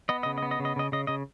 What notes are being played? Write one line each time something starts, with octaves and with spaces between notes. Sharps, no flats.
B3 D#5
C#3 D#5
D#5
B3
D#5
C#3
D#5
C#3 D#5
C#3 D#5
C#3 D#5